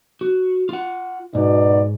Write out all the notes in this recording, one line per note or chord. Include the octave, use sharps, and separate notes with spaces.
F#4
F4 F#5
G#2 B2 D#4 D5